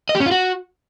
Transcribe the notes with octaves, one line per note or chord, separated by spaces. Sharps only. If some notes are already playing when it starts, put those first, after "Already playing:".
D#5
G4
C#4
F4
F#4